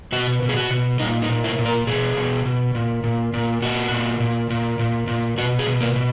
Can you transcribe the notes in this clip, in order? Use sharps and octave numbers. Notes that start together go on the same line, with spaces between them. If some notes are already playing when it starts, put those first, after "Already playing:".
B2 F#4
B2
G#4
F#4
B2
A#2 D#4
D#4
A#2
E4
A#2
A#4
B2 G#4
B2
B2
A#2
A#2
A#2
A#2 F#4
A#2
A#2
A#2
A#2
A#2
B2 F#4
G#4
B2
A#3
B2